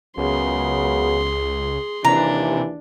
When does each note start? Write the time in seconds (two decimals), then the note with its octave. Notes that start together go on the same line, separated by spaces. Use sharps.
0.18 C#2 F#2 C#3 B3 G#4 C6
2.05 D#2 C3 E3 D4 A#5